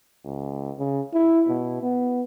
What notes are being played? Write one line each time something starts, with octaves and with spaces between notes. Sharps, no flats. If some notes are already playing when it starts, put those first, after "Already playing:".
C#2
C#3
E4
B2
B3